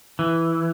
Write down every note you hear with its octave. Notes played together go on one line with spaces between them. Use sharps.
E3